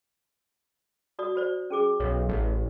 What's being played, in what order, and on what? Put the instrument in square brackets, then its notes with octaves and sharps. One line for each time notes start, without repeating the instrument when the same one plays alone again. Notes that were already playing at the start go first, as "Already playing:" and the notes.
[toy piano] F#4 D5 D#6
F#4 C5 D5
C#4 G#4 D6
[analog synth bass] B1 [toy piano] C#5
[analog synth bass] A1